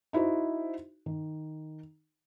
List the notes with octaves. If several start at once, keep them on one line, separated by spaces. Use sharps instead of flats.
D#4 E4 F#4 C5
D#3